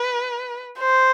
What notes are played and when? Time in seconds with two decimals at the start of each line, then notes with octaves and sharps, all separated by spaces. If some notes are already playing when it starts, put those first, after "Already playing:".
Already playing: B4
0.79 C5